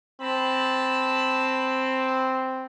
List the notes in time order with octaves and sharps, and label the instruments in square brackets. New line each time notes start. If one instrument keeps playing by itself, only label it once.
[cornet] C4 [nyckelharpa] A5 B5